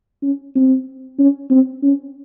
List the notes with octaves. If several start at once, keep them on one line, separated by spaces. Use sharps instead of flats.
C#4
C4
C#4
C4
C#4